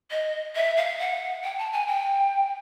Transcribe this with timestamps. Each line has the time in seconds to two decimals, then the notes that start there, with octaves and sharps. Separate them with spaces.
0.11 D#5
0.56 E5
0.77 F5
0.99 F#5
1.44 G5
1.58 A5
1.73 G#5
1.87 G5